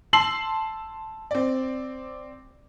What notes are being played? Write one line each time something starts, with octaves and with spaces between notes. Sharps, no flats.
A5 C6 E6 C7 F#7
C4 D5